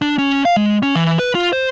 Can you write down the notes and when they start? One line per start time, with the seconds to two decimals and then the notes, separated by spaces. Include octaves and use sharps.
0.02 D4
0.18 C#4
0.45 F5
0.57 G#3
0.83 C#4
0.95 E3
1.19 B4
1.35 F4
1.53 C5